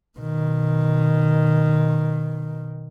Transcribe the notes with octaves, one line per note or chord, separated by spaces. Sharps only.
B2 D#3